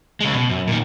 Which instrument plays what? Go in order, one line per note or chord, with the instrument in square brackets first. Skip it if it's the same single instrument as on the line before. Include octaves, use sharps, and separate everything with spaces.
[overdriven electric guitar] C#3 G#3
B2
F#2
A#2 D#3